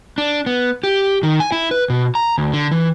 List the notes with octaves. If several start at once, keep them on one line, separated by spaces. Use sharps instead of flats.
D4
B3
G4
D#3
G#5
E4
B4
B2
A#5
D2
D3
E3